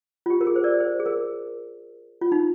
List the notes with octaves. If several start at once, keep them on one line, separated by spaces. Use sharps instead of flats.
F4
G4
A#4
G#4
C5
A#4 D5
C5
G#4
A#4
F4
D#4